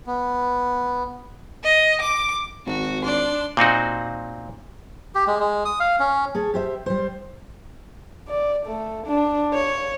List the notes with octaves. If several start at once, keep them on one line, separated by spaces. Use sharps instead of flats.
B3
D#5
D6
G#1 F#4
D4 D5 C6
A#2 C4 D#4 F#4
G4
G#3
G#3
D#6
F5
C#4
G#4 A4 C#5
G4 C5 E5
G3 C5
D5
A3
D4
C#5